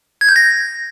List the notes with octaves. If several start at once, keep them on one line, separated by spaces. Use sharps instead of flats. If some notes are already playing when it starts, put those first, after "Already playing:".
G#6
G6
A#6